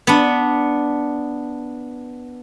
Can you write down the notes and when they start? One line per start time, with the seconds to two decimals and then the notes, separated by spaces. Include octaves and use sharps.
0.07 B3 D4